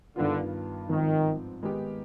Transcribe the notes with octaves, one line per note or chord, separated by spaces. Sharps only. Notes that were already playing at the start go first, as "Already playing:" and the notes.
G2 D3 D#3 B3 F4
G#2 D#3 F3 C4
D#3 G#3 B3 D#4 G4